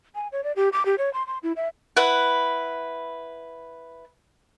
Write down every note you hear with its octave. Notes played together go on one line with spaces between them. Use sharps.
G#5
C#5
D5
G4
D6
G4
C#5
C6
C6
E4
E5
E4 B4 F#5